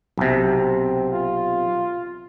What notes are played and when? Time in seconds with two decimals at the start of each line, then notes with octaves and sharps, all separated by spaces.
0.18 B1 C3
0.58 C4
1.12 F4